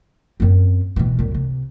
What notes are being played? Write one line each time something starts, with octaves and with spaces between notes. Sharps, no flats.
F#2 C4
B2 E3
C2 F#2
C3